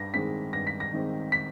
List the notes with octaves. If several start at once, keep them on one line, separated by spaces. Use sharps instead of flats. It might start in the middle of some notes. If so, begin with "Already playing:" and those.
Already playing: G2 A#6
D#3 G#3 C4 B6
G2 A#6
B6
A#6
D#3 G#3 C4
B6